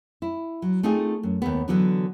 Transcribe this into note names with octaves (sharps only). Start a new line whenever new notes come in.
E4
F#3
A3 C4 D#4 F4 G#4
F#2
D#2 A3 B3
D3 E3 F#3 B3 D4